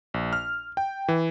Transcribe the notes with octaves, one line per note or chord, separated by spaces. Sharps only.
A#1
F6
G5
E3